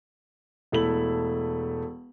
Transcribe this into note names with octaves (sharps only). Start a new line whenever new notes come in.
E1 A3 E4 F#7